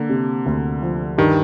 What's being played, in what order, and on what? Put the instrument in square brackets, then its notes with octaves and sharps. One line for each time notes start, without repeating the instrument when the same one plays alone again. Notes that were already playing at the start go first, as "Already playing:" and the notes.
Already playing: [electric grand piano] D3 [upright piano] A#3
[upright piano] C3
D2
F3
[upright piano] G2 [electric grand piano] D#3